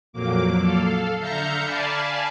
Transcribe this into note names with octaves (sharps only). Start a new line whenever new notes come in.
F2 A#2 F#3 A#3 D6
A4 F5
D3 E5 F5 A#5 G6 C#7
D5 F5 G#5 A5 B5